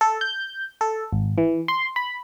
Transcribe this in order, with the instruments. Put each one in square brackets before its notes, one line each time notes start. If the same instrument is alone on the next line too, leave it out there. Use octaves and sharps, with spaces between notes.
[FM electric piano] A4
G6
A4
G#1
E3
C6
B5